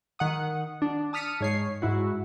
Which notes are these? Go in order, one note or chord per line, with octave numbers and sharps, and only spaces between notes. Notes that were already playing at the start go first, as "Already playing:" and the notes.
D#3 F#5 D#6
D4
A5 D#6 F6 B6 C#7 D#7
G#2 C#5 C7
G#2 E4 F#4